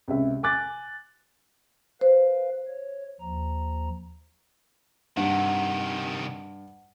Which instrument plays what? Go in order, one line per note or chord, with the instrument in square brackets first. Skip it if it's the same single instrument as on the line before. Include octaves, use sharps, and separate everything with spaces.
[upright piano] C#2 C3 E5
G#5 D6 F#6 A6
[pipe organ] B4 F5 [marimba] C5
[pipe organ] C#5
D#2 F3 A#5
[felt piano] G2 [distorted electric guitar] C3 D#3 [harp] F#5